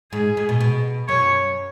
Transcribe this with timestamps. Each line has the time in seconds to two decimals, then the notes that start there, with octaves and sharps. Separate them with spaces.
0.13 G#2 G#4
0.37 G#2
0.49 B2
0.61 B2
1.08 F#2 C#5